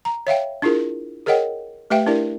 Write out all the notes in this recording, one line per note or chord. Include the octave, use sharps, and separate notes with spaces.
A#5
C#5 E5 F5 G5
D4 E4 F4 G#4 A#4
G#4 A#4 C#5 D#5 F#5 G5
A3 G4 B4 E5 F5 G5
D4 E4 G4 A#4 D5